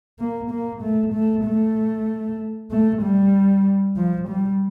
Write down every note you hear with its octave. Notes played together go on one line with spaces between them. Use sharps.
A#3
A#3
A3
A3
A3
A3
G3
F3
G3